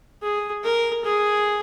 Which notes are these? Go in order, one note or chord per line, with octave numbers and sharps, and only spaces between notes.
G#4
A#4
G#4